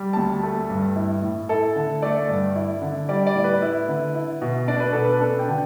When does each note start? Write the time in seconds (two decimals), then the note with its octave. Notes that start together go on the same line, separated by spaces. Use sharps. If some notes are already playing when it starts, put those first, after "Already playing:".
Already playing: G3
0.13 D2 A5
0.43 A3
0.70 G2
0.96 E4
1.22 A2
1.49 E4 A4
1.76 D3
2.02 A3 D5
2.29 G2
2.56 E4
2.82 D3
3.09 G3 D5
3.27 D5
3.35 A2
3.44 B4
3.62 E4
3.88 D3
4.15 E4
4.42 B2
4.68 D4 D5
4.80 B4
4.93 B2 A4
5.05 B4
5.21 D4 A4
5.39 G5
5.48 D3